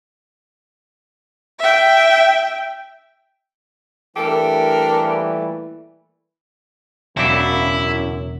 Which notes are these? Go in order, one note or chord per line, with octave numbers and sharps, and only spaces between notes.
E5 G5
A#2 E3 G3 A3 D4 G4 A4 A#4
E1 F#2 C#3 F#3 E4 D5